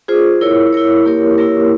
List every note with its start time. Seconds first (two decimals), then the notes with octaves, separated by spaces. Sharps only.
0.08 F4 G#4 C5
0.41 E4 A#4 C#5
0.73 E4 A#4 C#5
1.05 A#3 E4 G4 A#4 C#5
1.37 A#3 E4 G4 A#4 C#5